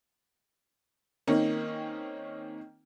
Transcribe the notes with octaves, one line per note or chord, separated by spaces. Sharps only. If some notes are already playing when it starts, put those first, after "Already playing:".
D#3 A#3 C4 C#4 D#4